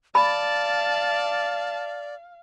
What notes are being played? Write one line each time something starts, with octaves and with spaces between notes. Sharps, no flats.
D5 F5 A5 B5